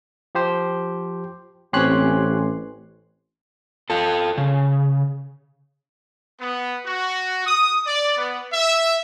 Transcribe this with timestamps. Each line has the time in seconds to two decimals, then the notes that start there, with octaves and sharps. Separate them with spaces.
0.35 F3 G4 C5
1.73 A1 C4 G4 C#5 G#5 C6 F#6
3.90 F4 A4
4.38 C#3
6.41 B3
6.86 F#4
7.46 D#6
7.87 D5
8.17 B3
8.53 E5